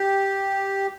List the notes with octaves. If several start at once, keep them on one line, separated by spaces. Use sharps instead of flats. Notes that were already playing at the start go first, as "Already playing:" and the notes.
Already playing: G4